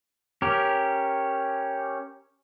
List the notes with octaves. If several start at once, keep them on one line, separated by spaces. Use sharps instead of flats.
C#4 G4 A#4